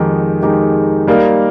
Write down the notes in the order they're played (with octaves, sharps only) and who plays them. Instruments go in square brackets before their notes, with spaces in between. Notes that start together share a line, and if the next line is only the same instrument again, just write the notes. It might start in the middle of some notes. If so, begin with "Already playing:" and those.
Already playing: [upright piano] F2 D#3 G#3 D#4 G4
F2 D#3 G#3 D#4 G4
G3 A#3 D#4 A#4